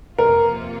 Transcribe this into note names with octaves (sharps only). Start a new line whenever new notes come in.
F2 C3 A#3 F4 A#4